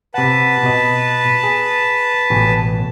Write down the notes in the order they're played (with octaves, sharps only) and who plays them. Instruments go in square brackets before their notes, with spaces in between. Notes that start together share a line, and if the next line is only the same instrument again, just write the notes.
[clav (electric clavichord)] C3 F#5 [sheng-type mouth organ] B4 A5
[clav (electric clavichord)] B2 D#5
G#4
A1 B2 G#5